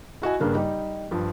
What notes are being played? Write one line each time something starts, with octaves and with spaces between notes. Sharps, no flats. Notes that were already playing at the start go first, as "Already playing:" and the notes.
E4 F#4 D#5 G#5
G2 C#3 A#3 D4
G3 D#4 G4
G2 F3